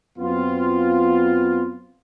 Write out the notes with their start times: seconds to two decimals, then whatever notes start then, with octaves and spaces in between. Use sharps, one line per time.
0.19 F#2 B3 C4 F4